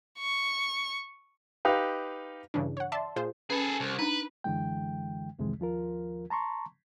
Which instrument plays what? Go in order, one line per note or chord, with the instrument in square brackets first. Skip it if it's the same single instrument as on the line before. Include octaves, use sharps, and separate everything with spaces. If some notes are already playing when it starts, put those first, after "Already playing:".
[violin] C#6
[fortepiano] D#4 G4 B4 F5
[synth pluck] G2 C#3 E3 D4
C#5 F#5
D5 E5 A5 C6
A#2 F4 G#4 C5
[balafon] C#4 B4 B5 [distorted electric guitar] G#4 A4
[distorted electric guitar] C2
[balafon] D4 D#4 A#5 [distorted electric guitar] B4
[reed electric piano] F#2 D3 E3 G#3 G5
C2 F2 C3 D#3 E3 G#3
D#2 F3 F4 A#4
A5 A#5 C6 C#6